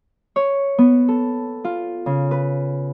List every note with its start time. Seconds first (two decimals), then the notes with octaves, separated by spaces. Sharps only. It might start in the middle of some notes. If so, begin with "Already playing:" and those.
0.36 C#5
0.78 B3
1.08 A4
1.64 F4
2.06 C#3
2.31 B4